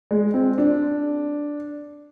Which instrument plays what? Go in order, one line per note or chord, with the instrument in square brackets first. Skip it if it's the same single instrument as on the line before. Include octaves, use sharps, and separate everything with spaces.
[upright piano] G#3
C4
D4